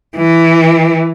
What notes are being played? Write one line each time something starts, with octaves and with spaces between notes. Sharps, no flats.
E3